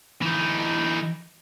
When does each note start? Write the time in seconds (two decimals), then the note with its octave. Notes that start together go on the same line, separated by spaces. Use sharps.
0.22 E3 D#4